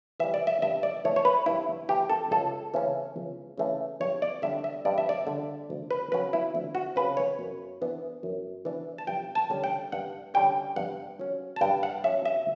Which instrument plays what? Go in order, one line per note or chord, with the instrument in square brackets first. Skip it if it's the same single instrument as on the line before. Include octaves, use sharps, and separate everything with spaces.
[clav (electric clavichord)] E3 G3 E5
D5
E5
G2 E5
D5
E3 A3 C#5
C#5
B4
G2 E4
E3 A3 G4
A4
C#2 A4
C#3 E3 A3 C#4
C#2
C#3 E3 A3 C#4
G2 C#5
D5
D3 G3 D4 E5
E5
G2 D5
E5
D5
D3 G3 D4
D2
B4
C#3 F#3 C#4 B4
E4
D2
F#4
C#3 F#3 C#4 B4
C#5
F#2
E3 B3 D4
F#2
E3 B3 D4
A5
G2 G5
A5
D3 G3 C#4
G5
G2 F#5
D3 G3 C#4 G5
G2 F#5
F#3 C#4
A5
G2 G5
F#5
F#3 C#4 E5
E5